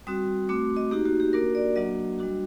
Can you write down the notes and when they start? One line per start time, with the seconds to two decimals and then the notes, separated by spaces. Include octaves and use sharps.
0.07 G3 C4 F#4 D#6
0.49 A3 C4 F#4 D6
0.77 D#5
0.91 A#3 D#4 F#4 G4
1.05 F#4
1.20 G4
1.33 A#3 D4 F#4 A#4
1.55 D5
1.76 F#3 A#3 D4 F#4 D#5
2.19 G3 D4 F#4